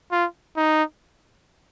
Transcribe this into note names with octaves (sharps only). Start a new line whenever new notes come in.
F4
D#4